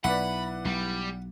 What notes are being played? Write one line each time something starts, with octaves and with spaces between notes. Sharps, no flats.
B1 E4 B4 D5 F#5 B5
B1 G3